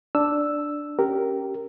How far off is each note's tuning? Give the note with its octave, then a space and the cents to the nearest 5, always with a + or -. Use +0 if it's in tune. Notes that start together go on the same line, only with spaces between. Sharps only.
D4 +0 E6 +0
C#4 -10 G4 -15 A#4 -5